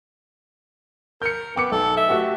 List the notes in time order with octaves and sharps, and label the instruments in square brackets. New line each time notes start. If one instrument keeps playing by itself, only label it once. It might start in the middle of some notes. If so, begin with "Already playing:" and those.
[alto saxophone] A#4 [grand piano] G6 C#7
[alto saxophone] B3 [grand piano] G5 D6 C#7
[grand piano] B1 [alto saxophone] A4
[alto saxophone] E5
[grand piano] A3 F#4 G4